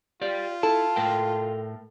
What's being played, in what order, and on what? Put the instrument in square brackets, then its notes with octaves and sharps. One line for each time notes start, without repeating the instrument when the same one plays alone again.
[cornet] F4 [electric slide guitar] G4 D5
[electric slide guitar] E4 [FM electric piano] A4 [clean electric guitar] A5
[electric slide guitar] A2 A#4 G5